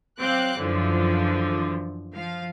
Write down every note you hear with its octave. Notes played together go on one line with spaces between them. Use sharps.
F#3 C4 F5 G5 D6 F#6
F#2 D3 E3 F3
F3 F5